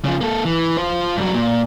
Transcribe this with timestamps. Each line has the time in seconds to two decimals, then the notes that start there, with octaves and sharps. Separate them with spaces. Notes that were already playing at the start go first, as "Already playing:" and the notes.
0.05 C#3 F3
0.21 A#3 A4
0.45 E3
0.77 F4 C5
1.17 G2 F#3
1.34 A#2